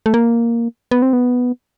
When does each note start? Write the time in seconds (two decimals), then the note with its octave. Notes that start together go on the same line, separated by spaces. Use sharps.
0.06 A3
0.14 A#3
0.91 B3
1.02 C4
1.13 B3